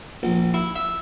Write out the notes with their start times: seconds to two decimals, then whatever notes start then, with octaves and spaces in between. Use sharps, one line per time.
0.23 A#1
0.54 E4
0.76 E5